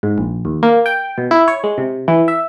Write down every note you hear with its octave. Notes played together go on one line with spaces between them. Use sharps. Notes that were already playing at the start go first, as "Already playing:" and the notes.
G#2
A#1
D#2
A#3
G5
B2
E4
C#5
G#3
C3
E3
E5